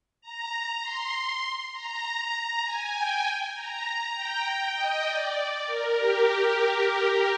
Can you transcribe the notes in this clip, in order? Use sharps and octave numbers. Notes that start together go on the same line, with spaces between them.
A#5
C6
A#5
G#5
G5
A#5
G5
G5
D#5
D5
A#4
G4